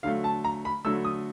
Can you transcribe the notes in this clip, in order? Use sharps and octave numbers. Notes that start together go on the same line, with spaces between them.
D3 F#3 A3 F5
A5
A#5
B5
D3 F#3 A3 E6
D#6